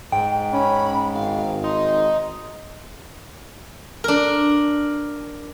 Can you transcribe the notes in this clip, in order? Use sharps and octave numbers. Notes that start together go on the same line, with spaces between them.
G#2 G5
C#4 B5
G#1 F5
D#4 C6
D4 A#4